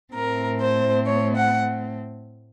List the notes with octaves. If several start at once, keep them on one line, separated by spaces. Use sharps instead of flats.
A2 A3 C4 A#4
C5
C#5
F#5